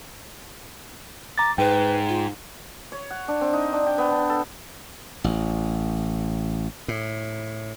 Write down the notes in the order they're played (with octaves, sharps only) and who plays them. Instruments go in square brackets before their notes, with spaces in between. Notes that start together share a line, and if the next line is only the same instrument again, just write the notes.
[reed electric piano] A#5 A6 [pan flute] D6
[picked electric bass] G#2 [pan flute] B4 [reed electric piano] G5
[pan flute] F4
[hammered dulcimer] C#5
F#5
D4
C4
D#4
D4
G5
B3
D4
A4
[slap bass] A1
A2